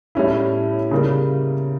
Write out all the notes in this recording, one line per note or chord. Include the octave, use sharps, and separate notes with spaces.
A2 G3 C#4 E4
C#3 G3 A#3